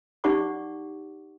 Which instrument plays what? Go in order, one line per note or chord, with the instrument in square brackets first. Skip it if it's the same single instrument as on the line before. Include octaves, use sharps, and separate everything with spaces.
[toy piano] D#4 G4 D5 F#5 C#6 D6